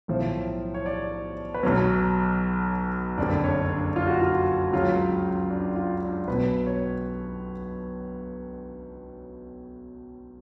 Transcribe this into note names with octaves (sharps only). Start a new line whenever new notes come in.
B1 A2 F3
C#5
D5
B4
B1 B2 F#3 C#5
F#1 F2 D3 D5
C#5
D4
F4
F#4
F4
C#2 C#3 F#3 F4
D4
F4
D4
B1 B2 F#3 B4
C#5